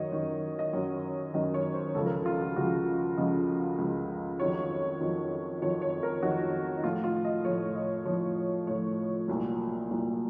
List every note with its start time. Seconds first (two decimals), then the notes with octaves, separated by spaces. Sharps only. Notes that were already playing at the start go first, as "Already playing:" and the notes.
Already playing: F#2 D#3 F#3 C#5 D#5
0.12 F#2 D#3 F#3
0.59 D#5
0.73 F#2 D#3 F#3 C#5
1.33 F#2 D#3 F#3 D#5
1.54 C#5
1.74 C5
1.95 C#2 C#3 F3 A4
2.06 A#4
2.11 A4
2.26 F4
2.41 F#4
2.56 C#2 C#3 F3 F#4
3.17 C#2 C#3 F3 D#5
3.78 C#2 C#3 F3
4.40 F2 D#3 F#3 C#5
5.01 F2 D#3 F#3
5.62 F2 D#3 F#3 C#5
5.82 C#5
6.03 A#4
6.22 F2 D#3 F#3 F#4
6.77 D#4
6.84 A2 F3 F4
7.04 F4
7.25 D#5
7.45 A2 F3 C#5
7.75 D#5
8.05 A2 F3 C#5
8.67 A2 F3 C#5
9.28 C2 A#2 F#3
9.90 C2 A#2 F#3